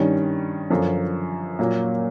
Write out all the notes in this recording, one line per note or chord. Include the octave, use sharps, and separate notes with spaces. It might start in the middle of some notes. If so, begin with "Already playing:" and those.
Already playing: G2 D#3 G3 C#4
F#2 D3 F3
A#2 F#3 A#3